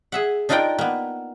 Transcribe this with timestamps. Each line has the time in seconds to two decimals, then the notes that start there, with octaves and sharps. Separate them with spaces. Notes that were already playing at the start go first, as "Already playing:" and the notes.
0.12 G#4 E5 F#5
0.49 D4 D#4 F4 A#4 D5 G5
0.78 A#3 B3